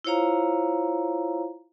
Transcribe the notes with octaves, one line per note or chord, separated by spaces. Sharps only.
E4 F4 C5 C#5 F5 A#5